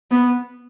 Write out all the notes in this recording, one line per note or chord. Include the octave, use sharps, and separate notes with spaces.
B3